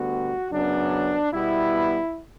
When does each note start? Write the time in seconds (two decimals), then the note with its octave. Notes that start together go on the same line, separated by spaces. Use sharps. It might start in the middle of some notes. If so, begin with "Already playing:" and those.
Already playing: D2 D3 G3 B3 F#4
0.51 F#2 C#3 F#3 B3 D4
1.33 B2 G3 B3 E4